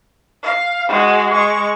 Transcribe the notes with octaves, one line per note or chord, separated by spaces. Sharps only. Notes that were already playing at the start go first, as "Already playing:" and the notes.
F5
G#3 F#4
G#3 C#6